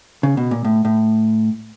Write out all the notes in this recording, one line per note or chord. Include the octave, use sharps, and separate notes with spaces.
C#3
B2
A#2
A2
A2